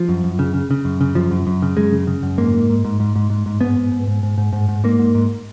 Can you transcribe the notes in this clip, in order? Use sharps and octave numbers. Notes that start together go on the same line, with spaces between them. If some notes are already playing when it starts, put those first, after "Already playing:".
Already playing: F3
F#2
F#2
C#3
C#3
C#3
F#2
C#3
F#2 F3
F#2
F#2
C#3
F#2 G#3
C#3
C#3
F#2
G#2 A#3
G#2
G#2
G#2
G#2
G#2
G#2
G#2
G#2 B3
G#2
G#2
G#2
G#2
G#2
G#2
G#2
G#2 A#3
G#2
G#2